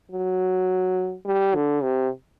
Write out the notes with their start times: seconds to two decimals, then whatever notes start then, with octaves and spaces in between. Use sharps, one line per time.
0.12 F#3
1.25 G3
1.55 D3
1.83 C3